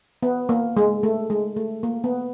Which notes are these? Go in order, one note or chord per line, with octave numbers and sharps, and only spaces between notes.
B3
A#3
G#3
A3
G#3
A3
A#3
B3